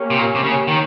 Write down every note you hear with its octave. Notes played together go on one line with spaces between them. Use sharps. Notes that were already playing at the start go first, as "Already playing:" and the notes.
Already playing: A#3 C#4 G4 C#5
C3
A#2
C3
C#3
D#3